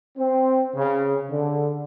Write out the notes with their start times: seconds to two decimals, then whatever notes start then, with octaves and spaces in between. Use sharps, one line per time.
0.17 C4
0.75 C#3
1.30 D3